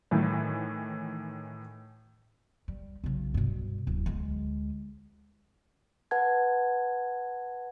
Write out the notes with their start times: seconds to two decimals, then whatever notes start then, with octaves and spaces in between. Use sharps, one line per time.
0.11 A2 D#3 E3
2.68 G3
3.04 B1 C#3
3.34 G2 B2
3.87 D1
4.06 D2 G#3
6.11 B4 F#5 A5 G#6